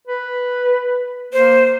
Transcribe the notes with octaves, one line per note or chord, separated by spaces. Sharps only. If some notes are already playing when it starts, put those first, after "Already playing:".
B4
A#3 C5